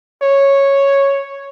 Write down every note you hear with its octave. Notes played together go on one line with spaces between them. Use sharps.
C#5